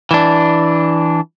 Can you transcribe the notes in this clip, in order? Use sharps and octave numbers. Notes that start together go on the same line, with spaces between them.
E3 D4